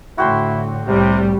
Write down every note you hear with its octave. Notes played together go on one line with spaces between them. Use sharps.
A2 D3 E4 F#4 G5 C6
C2 A2 C3 G3